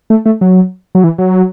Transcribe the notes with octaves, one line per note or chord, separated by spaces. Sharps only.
A3
A3
F#3
F#3
E3
F#3